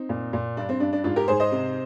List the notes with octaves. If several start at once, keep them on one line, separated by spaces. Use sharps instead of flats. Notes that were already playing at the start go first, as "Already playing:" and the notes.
Already playing: C4 D#4
A#2
A#2
G2 D4
C4
G2 D4
D4
G#2 D4 F4
G4 A#4
G#2 G#4 C5
C5 D#5
C3